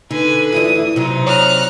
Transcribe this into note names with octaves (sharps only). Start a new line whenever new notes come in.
D3 D#4 B4 G#5
D2 E3 E4 F4 D5 D#6
C3 F#3 D#4
C#5 D5 A#5 F6 F#6